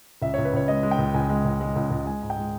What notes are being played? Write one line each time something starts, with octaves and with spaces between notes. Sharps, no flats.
C#2 E5
C#2 C#5
B4
C#2 C#5
G#3 D#5
G#3
G5
C#2
C#2 G#5
G#3
C#2
G#3
C#2
C#2
G#3 G#5
G#2
G5
G#3